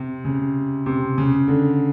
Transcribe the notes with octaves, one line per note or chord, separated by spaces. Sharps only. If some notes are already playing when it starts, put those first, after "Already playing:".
Already playing: C3
C#3
C3
C#3
D3